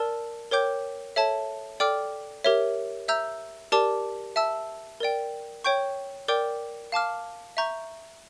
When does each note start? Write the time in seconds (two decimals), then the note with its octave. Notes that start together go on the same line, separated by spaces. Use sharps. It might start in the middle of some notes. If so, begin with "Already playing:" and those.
Already playing: A#4 D5 A5 E6
0.51 A#4 C#5 G5 D6 G6
1.16 A4 C#5 E5 A5
1.80 A4 D5 G5 D6 F6
2.44 G4 A#4 C#5 E5
3.08 E5 A#5 E6 G6
3.72 G4 A#4 D5 A5 D6
4.36 E5 A5 E6
5.00 A#4 D5 G5
5.64 C#5 G5 C#6 G6
6.28 A#4 D5 G5 D6 G6
6.92 F5 A5 D6 F6
7.57 E5 A#5 C#6 G6